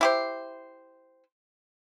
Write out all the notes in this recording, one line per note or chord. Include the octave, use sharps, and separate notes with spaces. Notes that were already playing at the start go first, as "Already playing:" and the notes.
E4 G4 C5